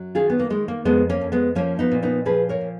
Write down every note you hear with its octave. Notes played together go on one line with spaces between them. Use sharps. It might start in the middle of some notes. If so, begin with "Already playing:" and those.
Already playing: F#2 F#3
D#3 F4 G#4
B3
A#3
D#3 G#3
A#3
F2 G#3 B3
A#3 C#4
F2
G#3 B3
F3 A#3 C#4
B3 D#4
A#2
B3 D#4
F3 G#4 B4
A#4 C#5
A#2